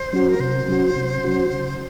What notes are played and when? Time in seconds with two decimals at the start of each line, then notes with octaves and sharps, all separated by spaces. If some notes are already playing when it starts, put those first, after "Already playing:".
Already playing: C5
0.13 F#3 C#4 F#4
0.29 A#4
0.40 C3 C5
0.68 F#3 C#4 F#4
0.96 C3
1.24 F#3 C#4 F#4
1.53 C#3